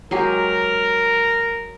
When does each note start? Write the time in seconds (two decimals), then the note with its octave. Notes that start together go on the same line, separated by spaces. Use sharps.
0.11 F#3 G#3 G4 A#4